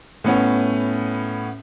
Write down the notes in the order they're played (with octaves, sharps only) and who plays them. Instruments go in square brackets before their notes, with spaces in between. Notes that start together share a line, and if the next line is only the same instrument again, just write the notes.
[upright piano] A2 B3 C#4